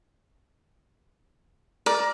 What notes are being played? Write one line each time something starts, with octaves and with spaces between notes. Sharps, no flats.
A#4 D5